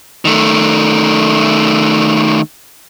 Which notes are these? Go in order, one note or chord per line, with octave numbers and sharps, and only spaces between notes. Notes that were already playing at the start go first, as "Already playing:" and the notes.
D#3 A3